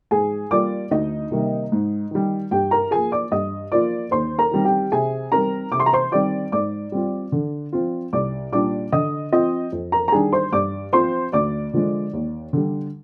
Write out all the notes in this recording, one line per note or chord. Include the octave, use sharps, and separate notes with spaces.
G#2 G#4 G#5
G3 A#3 F4 D5 D6
D2 D#4 D#5
C3 D#3 G3 A#3
G#2
D#3 G3
G2 G4 G5
A#4 A#5
F3 A#3 G#4 G#5
D5 D6
G2 D#5 D#6
F3 A#3 F4 D5 D6
D#2 C5 C6
A#4 A#5
D#3 G3 C4
G4 G5
C3 G#4 G#5
G3 C4 D#4 A#4 A#5
C3 D6
C6
A#5
C5 C6
D#3 G3 C4 D5 D6
G#2 D5 D6
G3 C4 F4
D3
F3 C4 F4
C2 D5 D6
A#2 G3 D4 F4 D5 D6
D3 D#5 D#6
F3 C4 F4 D#5 D#6
F2
A#4 A#5
A#5
D#3 G3 D4 G#4 G#5
C5 C6
G2 D5 D6
F3 C4 F4 C5 C6
D2 D5 D6
D3 F3 G#3
D#2
D3 G3